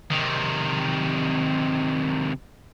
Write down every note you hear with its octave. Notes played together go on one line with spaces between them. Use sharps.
C3 D#3